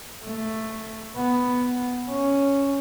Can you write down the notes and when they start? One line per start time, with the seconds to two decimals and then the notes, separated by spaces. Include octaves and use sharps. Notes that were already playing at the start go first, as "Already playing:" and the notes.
0.23 A3
1.16 B3
2.09 C#4